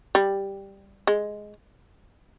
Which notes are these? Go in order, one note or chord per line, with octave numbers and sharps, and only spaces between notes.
G3
G#3